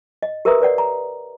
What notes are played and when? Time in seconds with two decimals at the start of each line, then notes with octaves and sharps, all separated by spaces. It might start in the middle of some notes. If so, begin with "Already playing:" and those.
0.23 D#5
0.45 G4 A#4 B4 E5 A#5 D#6
0.60 B4 C#5 D5 F#5
0.78 A#5